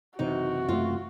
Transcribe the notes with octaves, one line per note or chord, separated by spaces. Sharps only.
F#1 C3 E3 D#4 F#4
F#2 A3 F4